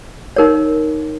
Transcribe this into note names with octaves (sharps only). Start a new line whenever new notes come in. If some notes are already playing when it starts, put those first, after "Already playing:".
D#4 A#4 C#5